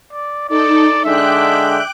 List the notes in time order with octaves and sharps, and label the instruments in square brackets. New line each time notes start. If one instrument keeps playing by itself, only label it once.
[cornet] D5
[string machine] D#4 A4 [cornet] D5
[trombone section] D3 G#3 D4 [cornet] E5 [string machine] G5 D6 F#6